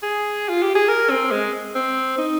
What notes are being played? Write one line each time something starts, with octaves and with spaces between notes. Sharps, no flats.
G#4
F4
G4
G#4
A#4
C4
G#3
C4
D#4